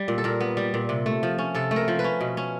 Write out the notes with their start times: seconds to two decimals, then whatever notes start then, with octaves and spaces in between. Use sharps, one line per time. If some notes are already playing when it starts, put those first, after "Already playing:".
Already playing: G3
0.08 A#2
0.18 A4
0.24 A#2 A#4
0.40 B3
0.57 G3
0.74 A#2
0.89 C3
1.06 A3
1.23 F3
1.38 C#4
1.55 C3 A4
1.71 A3
1.76 A#4
1.88 F3
1.99 B4
2.04 C#4
2.21 B2
2.37 C#4